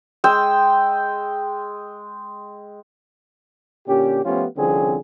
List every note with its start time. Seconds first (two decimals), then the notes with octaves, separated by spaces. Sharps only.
0.24 G#3 G5 E6
3.88 A#2 D3 C#4 G4
4.25 F3 A3 B3 C#4 F4 G4
4.57 C2 D3 F3 C4 C#4 G#4